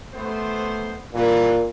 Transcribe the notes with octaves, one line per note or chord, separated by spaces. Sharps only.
A3 B3 C5
G2 A#2 E3